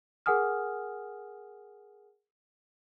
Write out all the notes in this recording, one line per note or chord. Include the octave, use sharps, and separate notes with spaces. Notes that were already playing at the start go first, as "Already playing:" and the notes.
G#4 A#4 F#5 G#5 D#6 F6